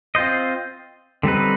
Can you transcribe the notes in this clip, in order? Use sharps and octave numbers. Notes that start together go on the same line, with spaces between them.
C4 F4 C5 D#5
D3 G3 C4 D#4 B4